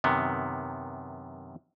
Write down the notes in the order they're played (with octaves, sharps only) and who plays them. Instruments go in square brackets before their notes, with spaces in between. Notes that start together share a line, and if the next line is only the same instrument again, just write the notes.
[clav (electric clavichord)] F#2 C3 D#3 B3